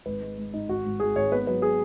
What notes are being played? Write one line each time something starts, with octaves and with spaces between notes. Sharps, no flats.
G#1 B4
G#3
G#3
G#2 D#4
G#1 F#4
G#2
G#1 G#4
G#1 C#5
B3 B4
F#3 B4
G#4